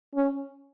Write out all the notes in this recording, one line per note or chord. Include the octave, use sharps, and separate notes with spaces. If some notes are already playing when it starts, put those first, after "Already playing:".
C#4